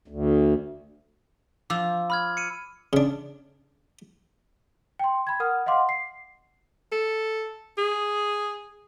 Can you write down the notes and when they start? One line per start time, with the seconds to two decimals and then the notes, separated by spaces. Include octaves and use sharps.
0.08 D2
1.70 F3 D6 E6
2.10 B5 F6 G#6
2.37 C#7 D#7
2.93 C#3 D4
4.99 G5 C6
5.27 B5 G#6
5.40 A#4 F#5 D#6 F6
5.66 D#5 F5 F#5 C6 D6
5.89 C7
6.92 A4
7.78 G#4